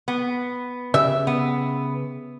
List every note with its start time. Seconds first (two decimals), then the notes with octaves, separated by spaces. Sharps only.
0.08 B3
0.94 C#3 G4 E5
1.27 B3